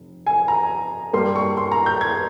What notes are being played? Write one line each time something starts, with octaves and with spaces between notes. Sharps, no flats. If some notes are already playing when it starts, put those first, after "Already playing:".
Already playing: F1
G#5
A#5
G2 G3 A#3 C6
C#6
C6
A#5
G6
G#6